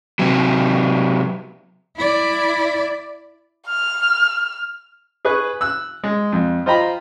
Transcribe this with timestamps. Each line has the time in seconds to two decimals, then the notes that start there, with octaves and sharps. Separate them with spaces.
0.19 C3 F#3
1.97 E4 D5
3.67 F6
5.25 G#4 B4 C#6 F#6
5.61 E6 F#6
6.04 G#3
6.32 F2
6.66 F4 C5 D#5 G5 A#5 B5